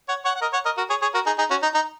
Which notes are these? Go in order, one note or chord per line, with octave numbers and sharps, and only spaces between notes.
C#5 F#5
C#5 F#5
F#5
A#4 D#5
C#5 F#5
A#4 D#5
F#4 A#4
G#4 C#5
G#4 C#5
F#4 A#4
D#4 G#4
D#4 G#4
C#4 F#4
D#4
D#4